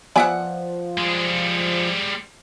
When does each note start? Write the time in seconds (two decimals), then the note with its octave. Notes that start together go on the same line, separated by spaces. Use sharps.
0.16 F3 B3 D5 E5 F#5 G#5 B5
0.98 G3 G#3